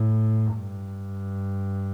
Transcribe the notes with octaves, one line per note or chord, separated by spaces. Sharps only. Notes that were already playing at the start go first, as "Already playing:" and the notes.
Already playing: A2
G2